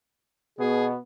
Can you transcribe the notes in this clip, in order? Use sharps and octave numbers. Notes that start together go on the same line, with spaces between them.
B2 B3 G#4